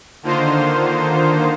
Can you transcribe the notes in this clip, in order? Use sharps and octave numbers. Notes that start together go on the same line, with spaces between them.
D3 D#3 A#3 D#4 F4 C5